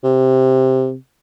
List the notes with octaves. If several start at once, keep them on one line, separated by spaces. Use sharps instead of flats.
C3